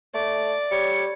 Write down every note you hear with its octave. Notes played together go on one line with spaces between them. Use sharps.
A3 D5
G3 C#5 C#7